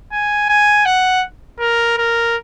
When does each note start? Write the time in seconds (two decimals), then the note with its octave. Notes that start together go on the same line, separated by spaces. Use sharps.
0.12 G#5
0.49 G#5
0.85 F#5
1.60 A#4
1.97 A#4